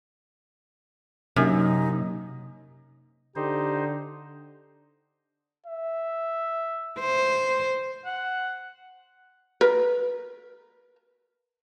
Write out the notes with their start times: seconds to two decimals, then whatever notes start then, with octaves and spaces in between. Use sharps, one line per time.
1.36 F#2 C3 F#3 A#3 D#4 G4
3.36 D3 D#4 G4 C5
5.66 E5
6.99 C5
8.05 F#5
9.61 A#4 B4